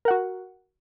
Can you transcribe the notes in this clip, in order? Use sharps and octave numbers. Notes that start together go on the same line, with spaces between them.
F#4 A#4 F#5